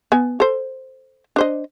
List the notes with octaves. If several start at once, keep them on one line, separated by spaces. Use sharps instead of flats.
B3 G#5
A4 C5
D4 C5 D#5